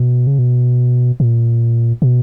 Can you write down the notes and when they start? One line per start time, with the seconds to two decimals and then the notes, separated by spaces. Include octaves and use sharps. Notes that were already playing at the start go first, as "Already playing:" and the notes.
Already playing: B2
0.27 C#3
0.39 B2
1.20 A#2
2.02 B2